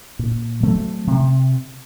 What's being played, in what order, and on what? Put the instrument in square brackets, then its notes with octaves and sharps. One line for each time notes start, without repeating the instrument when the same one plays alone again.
[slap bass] A#2
F#3 A3 C4
C3